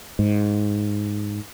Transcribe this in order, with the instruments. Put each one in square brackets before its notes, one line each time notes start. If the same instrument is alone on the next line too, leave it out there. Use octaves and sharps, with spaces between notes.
[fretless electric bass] G#2